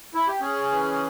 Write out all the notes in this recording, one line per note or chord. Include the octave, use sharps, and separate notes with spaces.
E4
G4
C#4 G#4
E3